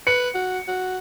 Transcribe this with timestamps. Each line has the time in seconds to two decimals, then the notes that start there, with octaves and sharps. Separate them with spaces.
0.07 B4 C#7
0.34 F#4
0.68 F#4